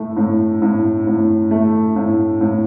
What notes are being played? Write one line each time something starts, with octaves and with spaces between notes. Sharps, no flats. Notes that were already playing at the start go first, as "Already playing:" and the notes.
Already playing: A2 A3
A2
A2
A2
A3
A2
A2